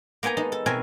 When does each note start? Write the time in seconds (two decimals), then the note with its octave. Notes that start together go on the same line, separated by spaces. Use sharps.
0.23 A#3 B3 G5 G#5 A#5
0.37 G#3 D#4 A5
0.52 A4
0.66 B2 C4 A#4 E5 G#5